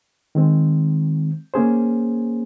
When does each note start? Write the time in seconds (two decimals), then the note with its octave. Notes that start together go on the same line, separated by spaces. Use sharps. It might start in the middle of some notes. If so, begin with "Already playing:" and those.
0.35 D#3 G#3 C4
1.54 A#3 C#4 G#4 C5